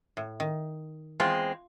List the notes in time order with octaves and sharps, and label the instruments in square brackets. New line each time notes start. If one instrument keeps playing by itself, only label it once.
[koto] A2
D#3
[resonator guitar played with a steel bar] E2 G#3 C4 [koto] F4